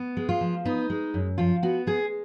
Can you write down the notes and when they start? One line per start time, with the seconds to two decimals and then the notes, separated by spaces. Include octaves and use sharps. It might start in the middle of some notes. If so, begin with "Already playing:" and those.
Already playing: B3
0.17 G#3
0.29 F4
0.41 F3
0.65 B3 D#4
0.90 G#3
1.14 F#2
1.38 F3 F4
1.62 B3 F#4
1.87 G#3 G#4